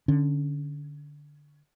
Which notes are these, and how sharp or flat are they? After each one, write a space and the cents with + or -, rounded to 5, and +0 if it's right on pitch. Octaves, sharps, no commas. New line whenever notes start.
D3 +0 C#4 +10